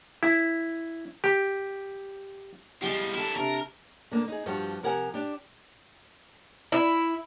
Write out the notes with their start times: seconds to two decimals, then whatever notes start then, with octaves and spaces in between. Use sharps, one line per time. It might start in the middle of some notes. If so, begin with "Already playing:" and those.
0.23 E4
1.24 G4
2.82 E2 F3 G3 G#3 G4
3.14 D3 E4 A4 A#4
3.36 C3 D4 A#4
4.12 D3 A#3
4.28 D#4 G#4
4.46 G2 F3 F#4 G5
4.83 C3 F3 A#4 F#5 G#5
5.14 D4 G4
6.72 E4